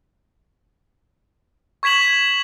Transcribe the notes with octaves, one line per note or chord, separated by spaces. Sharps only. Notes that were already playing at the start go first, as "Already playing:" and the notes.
C#6 G#6 B6 E7 F#7